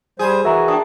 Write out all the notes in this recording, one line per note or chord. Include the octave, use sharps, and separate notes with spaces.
G3 G#4 C5
E3 F#4 A#4 E5 A#5
D4 G5 D#6